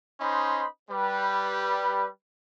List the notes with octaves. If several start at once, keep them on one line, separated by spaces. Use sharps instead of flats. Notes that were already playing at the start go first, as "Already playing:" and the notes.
C#4 D#4 C5 D#5 B5 C6
G3 B4